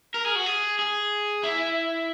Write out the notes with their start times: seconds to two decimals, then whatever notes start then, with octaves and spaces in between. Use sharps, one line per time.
0.14 A#4
0.25 G#4
0.35 F#4
0.46 G#4
0.79 G#4
1.43 E4